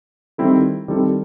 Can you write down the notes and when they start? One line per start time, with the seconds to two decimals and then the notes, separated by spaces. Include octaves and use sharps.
0.38 D#3 G3 C4 E4 A4
0.88 D#3 G3 C4 E4 A4